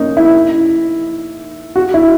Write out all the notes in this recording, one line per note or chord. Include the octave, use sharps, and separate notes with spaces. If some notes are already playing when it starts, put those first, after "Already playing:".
Already playing: A#3 C#4 D#4
E4
F#4
E4